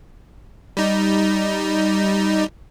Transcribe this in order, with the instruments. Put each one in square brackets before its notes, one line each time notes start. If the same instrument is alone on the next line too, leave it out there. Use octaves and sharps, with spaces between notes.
[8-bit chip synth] G3 D#4